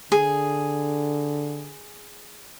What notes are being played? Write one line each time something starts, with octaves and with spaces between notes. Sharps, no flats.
D3 G#4